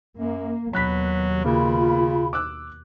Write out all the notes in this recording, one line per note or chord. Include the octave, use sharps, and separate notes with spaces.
F#2 A#3
D#2 B2 F#3 B5 F#6 B6
C#3 A#3 F4 B5
D6 E6 F#6